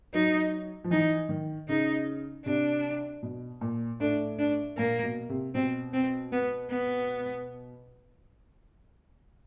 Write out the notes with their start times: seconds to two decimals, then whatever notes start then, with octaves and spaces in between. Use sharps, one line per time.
0.13 F#3 D#4
0.84 F3
0.91 E3 D#4
1.29 D#3
1.69 C#3 D#4
2.46 C3 D4
3.23 B2
3.61 A#2
4.00 A2 D4
4.39 D4
4.77 A#2 A#3
5.03 B2
5.29 C3
5.55 B2 C4
5.93 C4
6.32 B3
6.70 B3